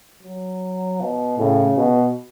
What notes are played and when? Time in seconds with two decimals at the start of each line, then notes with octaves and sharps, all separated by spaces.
0.22 F#3
1.01 B2
1.39 A2 C#3
1.77 B2